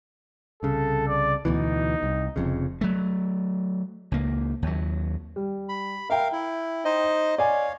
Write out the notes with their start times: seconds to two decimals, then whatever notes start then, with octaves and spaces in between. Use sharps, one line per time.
0.63 C2 C#3 A4
1.08 D5
1.45 D2 B2 E3 D#4
2.03 C2
2.36 F1 F2 C#3
2.81 F#3 A3
4.12 C#2 A#3
4.62 D#2 F#3
5.36 G3
5.69 B5
6.10 A#4 E5 F5 G5
6.32 E4
6.85 D#4 C5 D#5
7.38 C#5 D5 F5 G#5